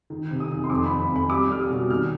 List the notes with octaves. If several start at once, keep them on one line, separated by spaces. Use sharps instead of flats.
D#3
C3
D#6
D#3
C6
F2 D6
B5
F2
B5
F2
B5
G3 D6
G3 F6
D#6
B2
D#3 F6